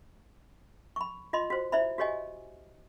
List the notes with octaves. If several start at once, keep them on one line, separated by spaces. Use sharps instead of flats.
B5 C#6
F4 D#5 B5 C6
F#4 C5
E4 C5 D5 E5 B5
F#4 G4 C#5 D#5 G#5